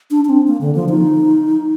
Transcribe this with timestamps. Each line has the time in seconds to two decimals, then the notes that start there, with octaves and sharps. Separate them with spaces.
0.11 D4
0.25 D4
0.29 C4
0.47 A#3
0.61 D3
0.75 F3
0.89 D#4